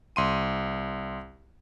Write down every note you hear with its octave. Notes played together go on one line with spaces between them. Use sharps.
C2 C6 D#7